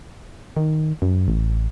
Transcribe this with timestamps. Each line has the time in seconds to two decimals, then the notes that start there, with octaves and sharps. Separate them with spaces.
0.57 D#3
1.02 F#2
1.28 A1